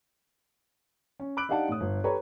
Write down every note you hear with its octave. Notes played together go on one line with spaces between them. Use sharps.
C#4
B5 D6 E6 F#6 D7 F#7
D4 D#4 G4 F5 F#5 A5
A2 D#6
G1
G4 A4 B4 C#5 A#5